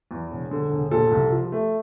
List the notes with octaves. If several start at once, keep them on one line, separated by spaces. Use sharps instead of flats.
E2
E1
D3
E1
A#2 A4
C2
F3
A3